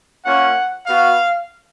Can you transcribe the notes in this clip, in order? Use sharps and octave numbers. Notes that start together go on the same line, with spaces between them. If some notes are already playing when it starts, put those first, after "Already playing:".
A#3 C#4 F4 F#5
B3 F#4 F5